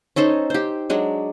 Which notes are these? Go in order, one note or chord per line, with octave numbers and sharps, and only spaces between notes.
C#4 D#4 A4 C5
G4 C5
F#3 G#3 D4